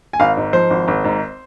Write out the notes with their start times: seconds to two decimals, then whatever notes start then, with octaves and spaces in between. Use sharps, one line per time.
0.13 G#5
0.20 G#1 F5
0.37 G#2
0.53 F3 C5
0.70 G#1
0.88 G#1
1.04 G#2